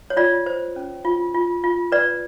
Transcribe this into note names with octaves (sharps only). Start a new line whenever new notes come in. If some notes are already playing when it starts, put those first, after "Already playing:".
C#5
F4 D5
C5
C#4
F4
F4
F4
B4 D5